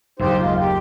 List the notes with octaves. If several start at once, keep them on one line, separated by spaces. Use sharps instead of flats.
F#1 D#2 D#4 G4 C5
G#3 F4
G4